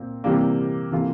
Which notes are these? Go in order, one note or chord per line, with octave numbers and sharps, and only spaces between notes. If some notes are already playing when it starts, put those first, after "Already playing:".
Already playing: A#2 C4
C3 E3 G3 A#3
C3 E3 A#3 F4 A4